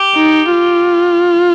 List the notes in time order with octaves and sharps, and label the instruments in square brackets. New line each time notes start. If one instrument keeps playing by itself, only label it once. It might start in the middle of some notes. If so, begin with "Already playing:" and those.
Already playing: [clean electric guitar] G4
[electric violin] D#4
F4